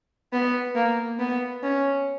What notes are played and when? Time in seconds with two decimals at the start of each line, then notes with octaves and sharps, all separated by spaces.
0.33 B3
0.76 A#3
1.19 B3
1.63 C#4